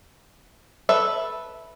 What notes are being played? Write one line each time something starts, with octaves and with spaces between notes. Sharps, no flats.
A4 B4 E5